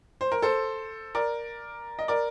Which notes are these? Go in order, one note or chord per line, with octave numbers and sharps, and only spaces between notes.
C5
A#4
A4 C5
A#4 D5
D#5
A#4 D5